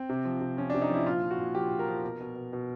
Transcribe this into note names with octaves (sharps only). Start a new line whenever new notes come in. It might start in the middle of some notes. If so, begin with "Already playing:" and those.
Already playing: C4
C3
F3
C3
F3 C#4
D4
C3
D#4
F3 E4
A#2 F4
F3
F#4
A#2
F3 G4
A#2
A#4
F3
B2
B2
B2
B2